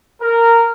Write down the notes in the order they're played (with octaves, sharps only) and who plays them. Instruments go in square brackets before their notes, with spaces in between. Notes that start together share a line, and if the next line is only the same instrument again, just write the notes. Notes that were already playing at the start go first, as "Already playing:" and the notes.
[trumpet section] A#4